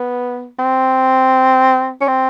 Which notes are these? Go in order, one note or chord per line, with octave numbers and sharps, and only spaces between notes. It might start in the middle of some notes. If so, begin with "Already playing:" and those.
Already playing: B3
C4
C#4
C4